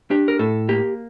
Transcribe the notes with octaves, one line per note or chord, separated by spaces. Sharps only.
D4 G4
A#4
A2 A4
A#3 G4